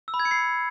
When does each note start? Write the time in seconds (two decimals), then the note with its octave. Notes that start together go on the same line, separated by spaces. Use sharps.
0.08 E6
0.14 B5
0.20 G#6
0.25 C#7
0.31 C7